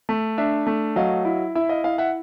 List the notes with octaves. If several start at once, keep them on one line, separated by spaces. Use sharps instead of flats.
A3
D4 E5
A3
F#3 D#5 F5
E4
E4 E5
D#5 F5
E4 D#5 F5
E5 F#5